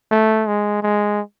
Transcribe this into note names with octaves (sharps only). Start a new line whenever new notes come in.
A3
G#3
G#3